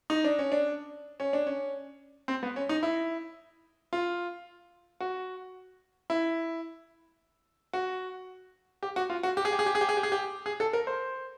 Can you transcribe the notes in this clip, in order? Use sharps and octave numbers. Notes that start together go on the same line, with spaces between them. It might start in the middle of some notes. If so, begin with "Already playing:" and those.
D#4
D4
C#4
D4
C#4
D4
C#4
C4
B3
C#4
D#4
E4
F4
F#4
E4
F#4
G4
F#4
F4
F#4
G4
G#4
G4
G#4
G4
G#4
G4
G#4
G4
G#4
G4
G#4
A4
A#4
C5